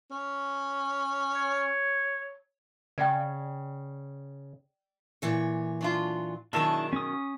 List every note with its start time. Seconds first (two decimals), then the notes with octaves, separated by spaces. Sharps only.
0.11 C#4
1.34 C#5
2.98 C#3 D5 G5
5.22 A#2 E3 C#5
5.81 F#3 D4 F4
6.53 B2 D#3 F#3 D4 E4 G#4 A5
6.93 C#4 D#6